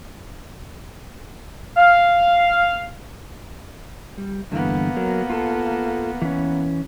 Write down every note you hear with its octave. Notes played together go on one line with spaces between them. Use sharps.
F5
G3
G2 D3 E3 A#3 B3
F#3 A#4
F4 A4
E3 C#4